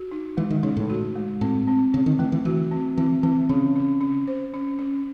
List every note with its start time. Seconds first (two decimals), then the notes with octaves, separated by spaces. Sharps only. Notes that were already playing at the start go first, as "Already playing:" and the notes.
Already playing: F#4
0.11 D#4
0.37 E3 G#3
0.50 D#3
0.63 C#3 D#4
0.77 A2
0.90 F#4
1.16 G#3
1.41 A2 C4
1.68 C4
1.94 C#3 C4
2.06 D#3
2.19 E3 A3
2.32 E3
2.45 E3 F#4
2.71 C4
2.97 E3 C4
3.23 E3 C4
3.49 C#3 C#4
3.76 C#4
4.01 C#4
4.28 C5
4.54 C#4
4.79 C#4